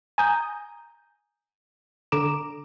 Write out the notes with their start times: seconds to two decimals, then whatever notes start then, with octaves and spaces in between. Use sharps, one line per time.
0.18 G#5 A#5 D#6 G6
2.12 D3 A#5 D6 D7 E7